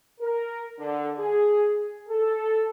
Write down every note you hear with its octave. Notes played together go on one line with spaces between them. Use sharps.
A#4
D3
G#4
A4